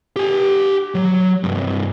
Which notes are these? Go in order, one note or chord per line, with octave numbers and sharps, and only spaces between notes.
G4 G#5
F#3
C2 G2